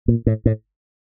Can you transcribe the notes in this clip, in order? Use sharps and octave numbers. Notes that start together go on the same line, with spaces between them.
A#2
A2
A2